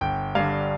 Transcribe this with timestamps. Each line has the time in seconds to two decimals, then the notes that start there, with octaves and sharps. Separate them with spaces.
0.01 G1 G5
0.35 G2 D3 F5